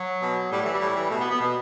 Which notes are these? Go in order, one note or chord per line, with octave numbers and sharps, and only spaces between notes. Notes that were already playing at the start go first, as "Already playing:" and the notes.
Already playing: F#3
B2
A2 G3
E3 A3
G3
A2
E3
B2 A3
B3
B3
B2